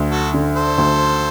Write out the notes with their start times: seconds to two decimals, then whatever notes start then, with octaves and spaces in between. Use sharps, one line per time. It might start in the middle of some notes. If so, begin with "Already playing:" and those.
Already playing: D2
0.10 F#4 A4
0.34 D3
0.55 A4 C5
0.78 D2